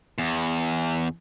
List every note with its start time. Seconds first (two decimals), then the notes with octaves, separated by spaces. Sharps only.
0.18 E2